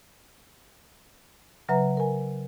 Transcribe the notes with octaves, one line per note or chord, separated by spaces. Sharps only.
C#3 F#3 B4 E5 A#5
A#4 G#5